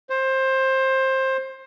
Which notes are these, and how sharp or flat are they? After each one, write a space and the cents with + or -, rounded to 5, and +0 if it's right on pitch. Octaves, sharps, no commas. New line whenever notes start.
C5 +20